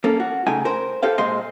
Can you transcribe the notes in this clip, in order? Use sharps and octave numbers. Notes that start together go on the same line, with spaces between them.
A#3 C#4 A4
F#4
C#3 A3 D#4 G5 G#5
A#4 C5
G4 A4 C5 F5
A#2 G#3 C5 D#5 C6